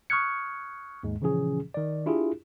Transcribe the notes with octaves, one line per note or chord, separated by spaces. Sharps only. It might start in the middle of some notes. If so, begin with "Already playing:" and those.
C#6 D#6 F6 F#6 G#6 C#7
D#2 G#2 G#3
A#2 C#3 E3 F3 C#4 G#4
D#3 D5
D4 E4 F4 G4 G#4